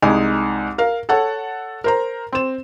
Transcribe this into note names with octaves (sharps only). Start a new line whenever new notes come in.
C2 G#3 D#4 G#5
A#4 F5
A4 C#5 F#5 A5
A#4 C5 A#5
C4 E7